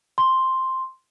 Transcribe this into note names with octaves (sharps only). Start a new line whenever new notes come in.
C6